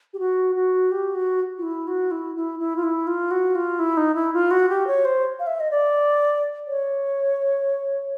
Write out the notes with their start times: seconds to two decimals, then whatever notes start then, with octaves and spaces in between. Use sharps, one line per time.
0.13 G4
0.19 F#4
0.55 F#4
0.91 G4
1.15 F#4
1.58 F4
1.63 E4
1.87 F#4
2.11 E4
2.36 E4
2.59 E4
2.76 F4
2.83 E4
3.07 F4
3.31 F#4
3.55 F4
3.79 E4
3.97 D#4
4.15 E4
4.34 F4
4.51 F#4
4.69 G4
4.87 C#5
5.05 C5
5.40 F5
5.47 E5
5.60 D#5
5.71 D5
6.67 C#5